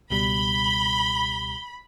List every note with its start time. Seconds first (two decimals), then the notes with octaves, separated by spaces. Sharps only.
0.10 C#2 B2 G3 B5 G7